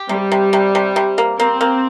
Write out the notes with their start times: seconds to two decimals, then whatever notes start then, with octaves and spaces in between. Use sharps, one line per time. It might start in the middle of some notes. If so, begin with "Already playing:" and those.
Already playing: G4
0.09 C3 G3
0.32 C3
0.53 C3
0.75 C3
0.96 C3
1.18 A#3
1.39 A#3 C4
1.61 A#3